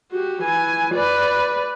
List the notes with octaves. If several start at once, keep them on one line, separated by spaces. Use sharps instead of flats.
F#4 G4
E3 G#5
B4 D5